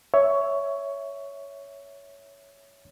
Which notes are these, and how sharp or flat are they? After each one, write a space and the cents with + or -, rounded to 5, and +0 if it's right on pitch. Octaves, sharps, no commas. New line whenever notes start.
C#5 +10 E5 +0